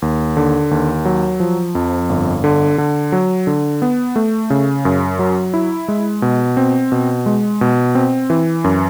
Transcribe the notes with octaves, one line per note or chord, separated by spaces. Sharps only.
D#2
D3
D#2
F#3
F3
F2
G1
D3
D3
F#3
D3
B3
A3
C#3
F#2
F#3
E4
G#3
B2
C4
B2
G#3
B2
C4
E3
F#2